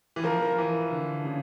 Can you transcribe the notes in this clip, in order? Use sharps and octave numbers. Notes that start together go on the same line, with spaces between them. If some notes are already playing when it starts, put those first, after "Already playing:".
E3
F3 A#4
E3
D3
C#3